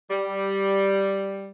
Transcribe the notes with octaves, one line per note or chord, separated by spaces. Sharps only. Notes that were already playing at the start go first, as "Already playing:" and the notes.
G3